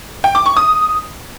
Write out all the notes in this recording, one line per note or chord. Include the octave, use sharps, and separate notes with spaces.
G5
D6
C#6
D#6